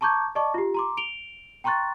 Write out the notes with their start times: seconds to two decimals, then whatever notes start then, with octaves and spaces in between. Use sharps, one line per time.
0.01 A5 A#5 C#6 D6 G6 G#6
0.35 D5 D#5 A5 C#6 D6
0.54 F4 G4
0.74 A#5 C6 D6
0.97 D7 F7 G7
1.64 G5 A#5 C6 C#6 F#6 A6